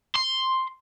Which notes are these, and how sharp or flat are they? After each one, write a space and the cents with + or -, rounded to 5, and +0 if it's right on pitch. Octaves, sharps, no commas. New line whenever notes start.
C6 +5